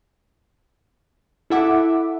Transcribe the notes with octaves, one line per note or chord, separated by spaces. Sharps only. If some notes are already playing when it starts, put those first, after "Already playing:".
E4 A4 E5 F#5 D6